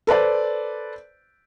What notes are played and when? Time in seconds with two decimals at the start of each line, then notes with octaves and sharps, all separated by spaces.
0.07 A4 B4 C5 D5